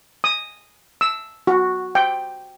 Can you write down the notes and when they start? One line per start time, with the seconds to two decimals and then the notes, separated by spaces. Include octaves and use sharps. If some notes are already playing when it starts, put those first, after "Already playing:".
0.24 D#6
1.01 E6
1.47 F#4
1.95 G5